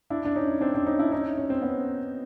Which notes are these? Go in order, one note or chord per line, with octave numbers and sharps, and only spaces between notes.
D4 E4
D4
C#4 D#4
C4 D4
C4 D4
C#4 D#4
D4 E4
C#4 D#4
C#4
C4
B3 C#4